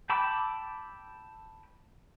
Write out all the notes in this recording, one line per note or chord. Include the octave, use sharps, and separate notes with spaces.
G5 A5 B5 D6 E6